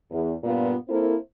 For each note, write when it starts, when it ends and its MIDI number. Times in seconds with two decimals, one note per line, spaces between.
0.11 0.31 40
0.44 0.72 43
0.44 0.72 46
0.44 0.72 59
0.44 0.72 65
0.89 1.14 58
0.89 1.14 60
0.89 1.14 64
0.89 1.14 69
0.89 1.14 70
0.89 1.14 72